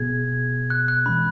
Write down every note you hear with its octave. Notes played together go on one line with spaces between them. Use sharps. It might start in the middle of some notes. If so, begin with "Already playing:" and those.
Already playing: B2 B3 G#4 G#6
F#6
F#6
E3 G#3 C#4 B5